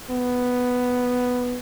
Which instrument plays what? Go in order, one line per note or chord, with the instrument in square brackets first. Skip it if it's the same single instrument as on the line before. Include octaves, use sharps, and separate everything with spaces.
[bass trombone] B3